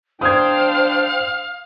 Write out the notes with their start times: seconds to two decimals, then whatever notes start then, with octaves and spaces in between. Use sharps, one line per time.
0.21 D4 C5 F5 G5 D#6 G#6